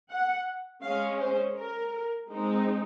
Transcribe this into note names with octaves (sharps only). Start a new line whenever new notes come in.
F#5
G#3 C#4 F5
C5
A#4
G#3 C4 D#4